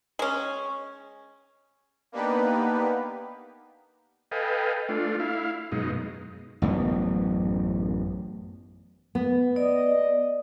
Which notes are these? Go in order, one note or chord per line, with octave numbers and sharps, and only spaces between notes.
G#3 C#4
A#3 B3 D4 D#4 G4 B4
A4 B4 D#5 F5 G5 G#5
A3 D4 F4
E4 F5
F#2 B2 G#3 D#4
A1 F#2 B3
B3
D5 D#5